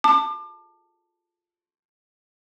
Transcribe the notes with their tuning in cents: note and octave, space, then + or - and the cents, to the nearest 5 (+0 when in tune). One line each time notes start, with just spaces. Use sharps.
A5 +10 D6 +35